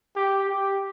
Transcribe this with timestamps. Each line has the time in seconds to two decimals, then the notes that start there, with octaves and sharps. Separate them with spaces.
0.16 G4
0.49 G4